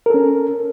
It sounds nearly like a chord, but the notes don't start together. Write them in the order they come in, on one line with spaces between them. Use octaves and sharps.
A#4 A4 C#4